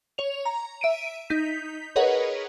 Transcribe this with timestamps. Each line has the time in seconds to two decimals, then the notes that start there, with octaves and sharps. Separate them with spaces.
0.18 C#5 F7
0.46 A#5
0.81 E5 D7 D#7
1.30 D#4 G6 B6
1.96 G#4 A#4 B4 C#5 D#5 F#5